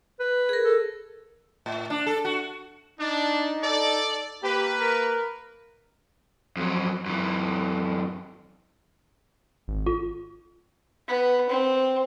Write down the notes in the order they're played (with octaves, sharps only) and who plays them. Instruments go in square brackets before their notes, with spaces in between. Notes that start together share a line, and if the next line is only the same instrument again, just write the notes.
[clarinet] B4
[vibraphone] G#4 A#4
[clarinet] A4
[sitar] A2
D4
A4
F#4
[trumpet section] D4 [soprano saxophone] D#4
[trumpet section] A4 D5
[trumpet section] A#3 B4 [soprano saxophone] G4
[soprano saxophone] A#4
[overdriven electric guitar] F2 F#3
F#2 E3
[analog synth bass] G#1
[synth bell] F4
[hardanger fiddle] B3
C4